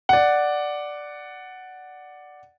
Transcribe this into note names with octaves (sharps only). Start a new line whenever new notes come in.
D5 F#5